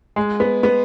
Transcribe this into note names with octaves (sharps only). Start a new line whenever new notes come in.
G#3
B3
B3